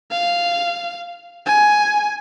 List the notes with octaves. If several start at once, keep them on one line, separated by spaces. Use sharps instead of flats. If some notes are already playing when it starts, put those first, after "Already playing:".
F5
G#5